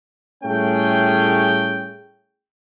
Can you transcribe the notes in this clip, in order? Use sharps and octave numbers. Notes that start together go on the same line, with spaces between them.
A2 G3 A3 C#4 G#4 G5